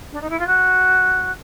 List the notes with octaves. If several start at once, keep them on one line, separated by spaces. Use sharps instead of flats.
D4
D#4
E4
F4
F#4